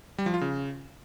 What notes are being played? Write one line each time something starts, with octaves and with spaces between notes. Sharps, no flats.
G3
F3
F4
C#3